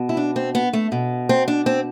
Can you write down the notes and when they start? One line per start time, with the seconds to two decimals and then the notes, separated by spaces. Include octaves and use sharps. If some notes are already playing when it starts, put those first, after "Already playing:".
Already playing: B2
0.09 E4
0.17 D4
0.36 C4
0.55 B3
0.73 A3
0.92 B2
1.29 C4
1.48 D4
1.66 C4